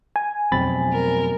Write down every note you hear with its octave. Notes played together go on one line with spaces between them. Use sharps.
G#5
F2 B2 F#3 C4 B5 A6
A#4